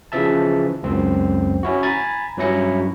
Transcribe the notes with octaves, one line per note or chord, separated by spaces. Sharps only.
C#3 E3 F3 E5 A5
C#2 F#2 C4
C#4 E4 F#4
G#5 A#5 B5 G#6 A6
G2 F#3 C#4 E4 A#6 C#7